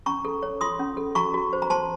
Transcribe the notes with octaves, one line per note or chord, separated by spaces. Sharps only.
C#4 A#5 C#6
A4
C#5
F4 C6 D#6
C#4
A4
F#4 A#5 C#6
F#4
C5
A#5
C5 A5 C6